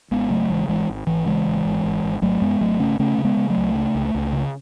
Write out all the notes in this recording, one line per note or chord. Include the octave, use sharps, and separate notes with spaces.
G#1 G#3 B3
C#3 F#3 A3
G#1 E3 G#3
G#1 E3 G#3
G#1
G#1 E3
C#3 E3 G#3
G#1
G#1
G#1
G#1
G#1 F#3 A3
F#2 G#3 B3
G#1 F#3 A3
C#3 A3 C#4
C#3 A3 C#4
C#3
G#3 B3
C#3
F#3 A3
C#2
C#3
C#2
C#2
C#3